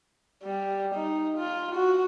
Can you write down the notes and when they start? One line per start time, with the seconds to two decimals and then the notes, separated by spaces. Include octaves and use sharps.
0.43 G3
0.95 D#4
1.38 F4
1.75 F#4